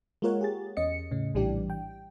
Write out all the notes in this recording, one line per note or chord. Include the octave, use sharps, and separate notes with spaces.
G#3 A#3 F4 A#4 C#5 F#5
G4 G#4 A6
E2 C#4 D#5 C#7
A2 C#3 C#4
A#1 A2 E3 G3 D4 G4
G5